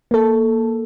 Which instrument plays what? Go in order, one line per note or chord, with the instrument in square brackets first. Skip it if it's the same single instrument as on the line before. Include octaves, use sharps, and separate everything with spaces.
[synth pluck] A#3 A4